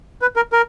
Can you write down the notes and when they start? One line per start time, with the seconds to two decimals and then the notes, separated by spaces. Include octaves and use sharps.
0.22 B4
0.36 A#4
0.52 A#4